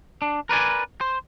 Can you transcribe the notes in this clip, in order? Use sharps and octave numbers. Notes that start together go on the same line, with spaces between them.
D4
A#4 B4 D5 G#5
C5